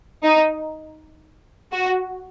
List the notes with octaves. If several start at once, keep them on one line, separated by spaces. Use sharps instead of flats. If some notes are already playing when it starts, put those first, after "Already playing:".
D#4
F#4